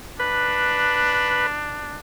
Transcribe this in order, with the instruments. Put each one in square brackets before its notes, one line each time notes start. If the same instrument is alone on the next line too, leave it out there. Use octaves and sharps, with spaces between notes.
[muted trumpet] D4 [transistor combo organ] B4